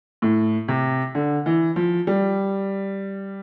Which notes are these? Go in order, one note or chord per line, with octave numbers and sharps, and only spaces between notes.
A2
C3
D3
E3
F3
G3